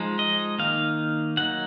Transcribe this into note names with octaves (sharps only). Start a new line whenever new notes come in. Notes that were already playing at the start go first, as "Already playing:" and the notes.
Already playing: F3 G#3 D#4
D#5
D#3 A#3 D#4 F5
F#3 A#3 D#4 F#5